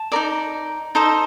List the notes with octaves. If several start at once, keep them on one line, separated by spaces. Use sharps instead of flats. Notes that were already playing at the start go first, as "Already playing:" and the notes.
Already playing: A5
D#4 A#4 D5
D#4 A4 C5 D#5